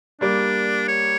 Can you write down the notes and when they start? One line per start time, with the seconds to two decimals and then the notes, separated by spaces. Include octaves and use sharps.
0.21 G3 A#3 D4
0.88 C#5